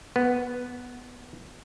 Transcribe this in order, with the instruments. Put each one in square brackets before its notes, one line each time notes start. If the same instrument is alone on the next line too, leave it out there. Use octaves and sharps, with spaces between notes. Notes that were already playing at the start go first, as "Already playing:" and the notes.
[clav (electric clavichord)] B3